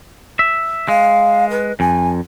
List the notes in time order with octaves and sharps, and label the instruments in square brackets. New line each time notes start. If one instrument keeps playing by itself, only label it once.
[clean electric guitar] E5
[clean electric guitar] G#3 [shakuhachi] F5
[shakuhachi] B4
[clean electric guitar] F2 [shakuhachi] G#5